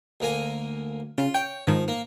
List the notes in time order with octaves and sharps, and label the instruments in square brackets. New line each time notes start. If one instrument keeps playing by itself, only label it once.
[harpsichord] D2 A#3 G#5
[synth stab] C#3 [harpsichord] F4
[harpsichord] C#5 [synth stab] G5
[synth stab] G#2 D#3 [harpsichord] F3
[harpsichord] A#3